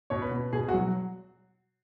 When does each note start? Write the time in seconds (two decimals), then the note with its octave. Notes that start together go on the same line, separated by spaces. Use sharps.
0.10 B2 C#5
0.22 B4
0.31 B2
0.53 B2 G#4
0.68 F#4
0.73 F#3